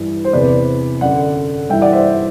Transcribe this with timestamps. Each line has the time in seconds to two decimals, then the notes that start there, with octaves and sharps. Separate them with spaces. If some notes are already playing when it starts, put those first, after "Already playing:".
Already playing: G2 E3
0.25 C5
0.33 E2 C3 E3 B4 D5
1.01 F#2 D3 D5 F#5
1.70 G2 E3 E5 G5
1.81 D5 F#5
1.93 C5 E5